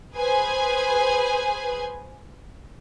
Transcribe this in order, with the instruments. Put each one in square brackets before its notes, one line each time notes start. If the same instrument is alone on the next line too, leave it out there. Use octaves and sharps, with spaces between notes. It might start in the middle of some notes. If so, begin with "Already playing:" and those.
[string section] G#4 B4 C5 G#5